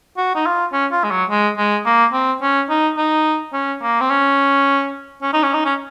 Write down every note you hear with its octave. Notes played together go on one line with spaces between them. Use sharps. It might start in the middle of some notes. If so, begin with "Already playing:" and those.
F#4
D#4
F4
C#4
F4
G#3
F#3
G#3
G#3
A#3
C4
C#4
D#4
D#4
C#4
A#3
C4
C#4
C#4
D#4
C#4
D#4
C#4